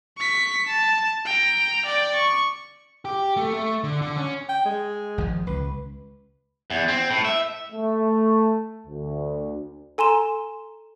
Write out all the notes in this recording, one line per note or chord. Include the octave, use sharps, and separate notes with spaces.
C#6 B6
A5
G5 A#5
D5 G5
C#6
G4
A3
A3
D3
D3
C#4
G5
G#3
G#1 D#3 F3
C#2 B4
E2
C4
A2
E5
A3
D2
A4 G#5 A#5 C6 E7